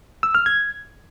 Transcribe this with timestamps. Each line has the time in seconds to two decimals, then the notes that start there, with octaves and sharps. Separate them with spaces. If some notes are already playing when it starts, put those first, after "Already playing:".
0.23 E6
0.35 F6
0.46 G#6